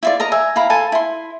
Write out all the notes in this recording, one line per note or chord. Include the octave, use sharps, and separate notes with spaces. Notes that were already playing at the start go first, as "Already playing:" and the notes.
E4 F4 D5
A#4 D#5 A#5
E5 G#5
E4 F5 A#5 B5
F4 A4 G#5 A5
E4 C6